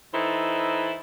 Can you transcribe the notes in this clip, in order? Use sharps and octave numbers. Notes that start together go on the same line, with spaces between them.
E3 D#4 E4 A4 C5